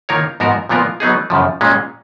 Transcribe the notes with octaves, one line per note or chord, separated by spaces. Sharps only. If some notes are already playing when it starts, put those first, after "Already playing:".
D#3 A#3 F4 A#4 C#5
G#2 F3 B3 F#4 A#4
A#2 F3 B3 F4 A#4
F#3 B3 D#4 G#4
F#2 C#3 F3
A#2 G#3 C#4 F4